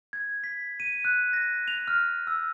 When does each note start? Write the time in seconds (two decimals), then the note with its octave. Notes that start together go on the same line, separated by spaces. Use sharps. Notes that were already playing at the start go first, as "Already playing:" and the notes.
0.13 G#6
0.44 B6
0.80 D#7
1.05 F#6
1.33 A#6
1.68 F7
1.88 F6
2.27 E6